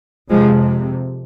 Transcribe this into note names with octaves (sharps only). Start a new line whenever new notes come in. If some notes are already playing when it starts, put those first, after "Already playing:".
F2 C3 F3 G#3